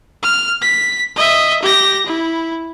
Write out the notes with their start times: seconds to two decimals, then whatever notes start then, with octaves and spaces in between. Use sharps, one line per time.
0.23 F6
0.61 B6
1.16 D#5 E5
1.62 G4 A#6
2.06 E4